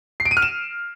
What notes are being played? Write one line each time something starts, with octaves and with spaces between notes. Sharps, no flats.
C7
D7
D#7
F6
E7